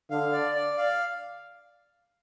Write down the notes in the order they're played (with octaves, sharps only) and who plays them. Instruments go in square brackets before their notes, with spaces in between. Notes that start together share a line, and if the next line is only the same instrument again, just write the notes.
[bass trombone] D3 [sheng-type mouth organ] F5
[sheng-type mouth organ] D5
D5
F5